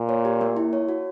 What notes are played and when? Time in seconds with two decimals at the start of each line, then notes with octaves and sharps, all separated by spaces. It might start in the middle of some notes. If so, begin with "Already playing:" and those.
Already playing: A#2
0.09 C#5
0.25 G4
0.41 A#3
0.57 E4
0.73 C#5
0.89 F#4